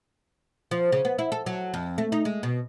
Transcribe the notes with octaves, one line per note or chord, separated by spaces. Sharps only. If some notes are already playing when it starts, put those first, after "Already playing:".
F3
C#3
B3
E4
A4
F#3
F2
A3
D#4
G#3
B2